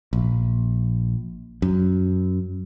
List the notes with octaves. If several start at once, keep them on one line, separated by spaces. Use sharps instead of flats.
A#1
F#2